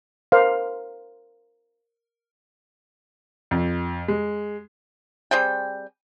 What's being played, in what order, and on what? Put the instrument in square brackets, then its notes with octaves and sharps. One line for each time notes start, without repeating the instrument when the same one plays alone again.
[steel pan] A#4 C5 F5
[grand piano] F2
G#3
[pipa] G3 C4 G#4 G5